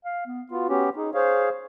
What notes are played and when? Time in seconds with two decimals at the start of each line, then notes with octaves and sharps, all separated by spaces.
0.05 F5
0.26 B3
0.51 B3 F4 F#4
0.69 B3 C#4 G4
0.96 D#4 G#4
1.14 G#4 C5 C#5 F5